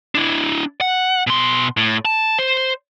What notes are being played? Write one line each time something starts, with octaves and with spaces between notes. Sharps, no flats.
D4 E4
F#5
B2 C6
A2
A5
C5